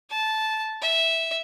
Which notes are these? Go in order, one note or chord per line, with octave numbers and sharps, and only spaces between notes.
A5
E5